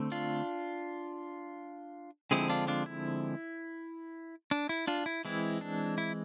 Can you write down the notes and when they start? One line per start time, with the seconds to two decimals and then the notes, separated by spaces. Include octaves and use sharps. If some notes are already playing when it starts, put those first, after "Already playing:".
Already playing: D3 A3 C4
0.12 D4 F4
2.31 D3 F3 G#3 C4 E4 G#4
2.50 D4 F4
2.68 D4 F4
2.86 E4
4.51 D4
4.69 E4
4.87 D4 F4
5.06 E4
5.25 E3 G#3 C4 E4
5.61 D4
5.98 E4